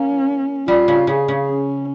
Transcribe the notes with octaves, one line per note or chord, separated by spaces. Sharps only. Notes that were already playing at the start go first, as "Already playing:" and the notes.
Already playing: A#3 C#4
G3 F4
C#3
C#3 G#4
C#3
C#4